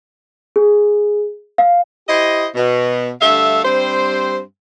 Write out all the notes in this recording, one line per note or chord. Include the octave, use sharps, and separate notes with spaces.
G#4
F5
E4 G4 C5 D#5
B2
G2 D3 A3 A4 E5 F5
G2 G3 C4 C5